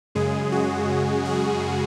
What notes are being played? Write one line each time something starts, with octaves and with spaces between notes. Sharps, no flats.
F#2 C#3 G#3 G#4
F#4
G#4